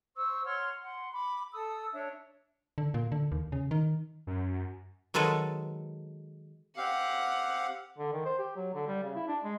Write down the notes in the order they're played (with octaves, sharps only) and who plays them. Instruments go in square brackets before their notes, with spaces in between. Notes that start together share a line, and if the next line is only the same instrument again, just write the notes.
[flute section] C5 C#6 E6
C#5 F#5 C6 F6
F#5 C6
B5 D6
A4 D#6 E6
D4 C#5 E5
[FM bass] D3
A#2
D3
D#2
C#3
D#3
[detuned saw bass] F#2
[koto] D#3 F#3 G#3 A4 B4
[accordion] C4 G4 F5 [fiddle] F#5
[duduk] D3
D#3
C5
G4
F#3
D3
G3
C#3
E4
D4
G#3